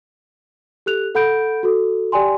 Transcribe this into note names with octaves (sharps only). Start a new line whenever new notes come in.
G4 A4 F#6 F7
A4 F#5 B5 G6 D7
F#4 A4
G4 D5 G5 G#5 C6